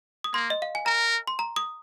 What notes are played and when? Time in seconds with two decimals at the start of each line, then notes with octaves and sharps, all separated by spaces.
0.24 D#6
0.34 A#3 C6
0.50 D#5
0.62 F5
0.75 G#5
0.86 A#4 A#5
1.27 C6
1.39 A#5
1.56 D#6